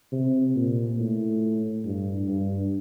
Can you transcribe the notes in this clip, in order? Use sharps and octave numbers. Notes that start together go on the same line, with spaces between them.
C3
A#2
A2
G2
G2